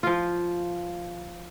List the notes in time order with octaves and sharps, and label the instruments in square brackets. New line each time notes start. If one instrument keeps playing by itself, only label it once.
[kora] F3 F4